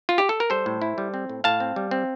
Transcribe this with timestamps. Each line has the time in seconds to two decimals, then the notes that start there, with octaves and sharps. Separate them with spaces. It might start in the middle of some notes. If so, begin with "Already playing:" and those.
0.09 F4
0.18 G4
0.29 A4
0.40 A#4
0.50 G3 A4 C5
0.66 A2
0.82 E4
0.98 G3
1.14 C4
1.29 A2
1.44 A2 F5 A5
1.60 C4
1.76 G3
1.91 C4